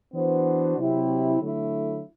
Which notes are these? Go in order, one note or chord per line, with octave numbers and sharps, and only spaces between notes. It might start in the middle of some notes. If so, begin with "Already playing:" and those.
E3 B3 D4 F#4 C5
C3 F#3 C4 E4 G4
D3 F#3 A3 E4